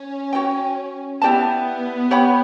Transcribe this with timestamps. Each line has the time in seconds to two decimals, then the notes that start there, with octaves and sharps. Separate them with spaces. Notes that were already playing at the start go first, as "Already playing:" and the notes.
Already playing: C#4
0.33 F#4 C#5 G5
1.22 B3 E4 G4 D5 A5
2.11 G4 C#5 F#5 B5